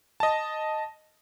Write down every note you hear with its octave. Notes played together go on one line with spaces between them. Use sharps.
D#5 A5